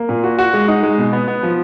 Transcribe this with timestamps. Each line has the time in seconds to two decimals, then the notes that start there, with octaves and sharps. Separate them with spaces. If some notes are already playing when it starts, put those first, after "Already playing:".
Already playing: A#3
0.09 A#2
0.24 F#4
0.39 F#4
0.54 G#3
0.68 D#4
0.83 G#3
0.98 B2
1.13 B3
1.28 B3
1.43 F3